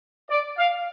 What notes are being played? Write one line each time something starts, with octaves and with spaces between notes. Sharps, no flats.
D5
F5